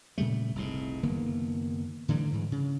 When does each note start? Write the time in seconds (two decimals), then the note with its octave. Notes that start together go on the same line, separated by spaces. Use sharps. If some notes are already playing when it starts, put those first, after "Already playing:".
0.18 A#2 C#3 G3 A3
0.55 F1 C2 G#2
1.03 F#1 D#3 A#3 B3
2.08 A2 D3 E3 G3
2.31 G#2 E3
2.52 C#3